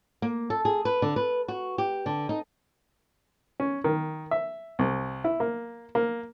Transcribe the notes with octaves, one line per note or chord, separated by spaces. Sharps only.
A#3
A4
G#4
B4
D3
B4
F#4
G4
D3
D#4
C#4
D#3
E5
C2
E4
A#3
A#3